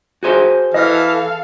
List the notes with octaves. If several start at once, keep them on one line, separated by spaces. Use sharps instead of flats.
F#4 G#4 C5
E3 A4 D#5 F5 F6